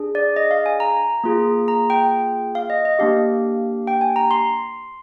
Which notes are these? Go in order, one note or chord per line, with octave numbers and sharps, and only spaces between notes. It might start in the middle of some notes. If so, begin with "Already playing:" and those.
Already playing: D4 G#4
D5
D#5
F5
G#5
A#5
A#3 F4 G#4
A#5
G5
F5
D#5
D#5
A#3 D4 G4 F5
G5
G#5
A#5
C6